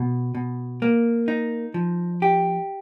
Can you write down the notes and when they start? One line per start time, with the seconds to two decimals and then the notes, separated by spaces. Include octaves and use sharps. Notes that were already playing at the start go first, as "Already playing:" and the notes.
Already playing: B2
0.35 B2
0.82 A#3
1.28 D#4
1.74 F3
2.22 G4